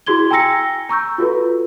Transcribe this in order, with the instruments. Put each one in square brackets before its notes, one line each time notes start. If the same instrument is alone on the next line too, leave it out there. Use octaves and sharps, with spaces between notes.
[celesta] E4 F#4 G#4 C6 G#6 G7
G5 G#5 A#5 E6 A#6 C#7
A#5 C#6 E6 G6
F4 F#4 A4 B4